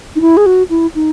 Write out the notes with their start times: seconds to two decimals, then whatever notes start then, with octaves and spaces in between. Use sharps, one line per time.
0.16 D#4
0.21 E4
0.37 G#4
0.46 F#4
0.70 E4
0.95 D#4